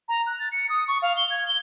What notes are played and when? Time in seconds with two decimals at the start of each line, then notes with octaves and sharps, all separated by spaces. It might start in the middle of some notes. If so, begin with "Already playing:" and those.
0.09 A#5
0.27 F#6
0.39 A6
0.52 C#7
0.69 D#6
0.88 C#6
1.02 F5
1.17 G7
1.30 G#6
1.47 G7